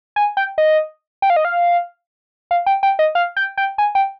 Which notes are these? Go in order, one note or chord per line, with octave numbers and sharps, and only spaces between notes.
G#5
G5
D#5
G5
F5
D#5
F5
F5
G5
G5
D#5
F5
G5
G5
G#5
G5